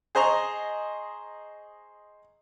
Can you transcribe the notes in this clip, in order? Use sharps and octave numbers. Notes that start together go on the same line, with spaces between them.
G#4 C5 D#5 A#5 C#6